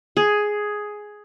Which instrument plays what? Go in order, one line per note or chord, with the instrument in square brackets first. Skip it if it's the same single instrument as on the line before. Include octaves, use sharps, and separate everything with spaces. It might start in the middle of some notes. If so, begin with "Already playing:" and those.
[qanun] G#4